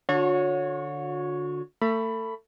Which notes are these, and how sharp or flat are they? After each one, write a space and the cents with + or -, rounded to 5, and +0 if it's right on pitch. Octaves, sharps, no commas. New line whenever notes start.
D3 +0 F#4 -40 C#5 +0
A3 +30 B5 +0